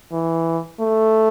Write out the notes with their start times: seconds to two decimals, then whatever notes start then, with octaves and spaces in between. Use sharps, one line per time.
0.12 E3
0.80 A3